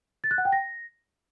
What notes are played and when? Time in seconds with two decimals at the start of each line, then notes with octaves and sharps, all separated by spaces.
0.24 A6
0.31 F#6
0.38 F#5
0.45 G5
0.52 A#6